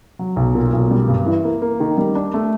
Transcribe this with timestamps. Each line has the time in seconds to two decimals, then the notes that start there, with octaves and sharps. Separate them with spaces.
0.19 F#3
0.36 B1
0.55 A#2
0.73 B1
0.91 G3
1.08 G2
1.26 E3
1.45 A#3
1.62 A#3
1.80 D#3
1.98 G3
2.15 D4
2.34 A3